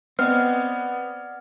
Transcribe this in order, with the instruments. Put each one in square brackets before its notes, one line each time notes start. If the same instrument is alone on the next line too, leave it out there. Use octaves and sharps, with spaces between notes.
[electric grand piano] B3 [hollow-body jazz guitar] C4 [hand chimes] D5 D#5 F#5 [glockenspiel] F6